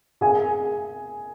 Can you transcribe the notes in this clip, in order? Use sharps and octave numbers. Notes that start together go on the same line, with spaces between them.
G#4 G#5